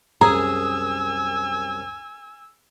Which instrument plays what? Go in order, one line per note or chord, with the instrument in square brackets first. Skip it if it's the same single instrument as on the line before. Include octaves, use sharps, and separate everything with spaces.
[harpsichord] C2 F#2 D#6 [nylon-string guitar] G#4 [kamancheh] G#5 E6 [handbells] A#5